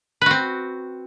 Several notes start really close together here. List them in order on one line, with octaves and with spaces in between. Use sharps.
B4 F#4 C4